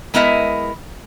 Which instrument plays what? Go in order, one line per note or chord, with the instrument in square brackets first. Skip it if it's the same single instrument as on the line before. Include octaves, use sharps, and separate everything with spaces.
[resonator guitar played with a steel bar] G#3 B3 E4 A#4 D#5 E5